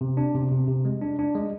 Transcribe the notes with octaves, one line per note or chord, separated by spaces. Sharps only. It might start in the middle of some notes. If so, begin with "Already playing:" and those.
C3
D4
C3
C3
C3
G#3
D4
D4
G#3